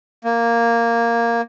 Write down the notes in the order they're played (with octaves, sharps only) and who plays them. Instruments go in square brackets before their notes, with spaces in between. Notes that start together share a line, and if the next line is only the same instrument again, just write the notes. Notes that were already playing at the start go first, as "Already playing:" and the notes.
[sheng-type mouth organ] A#3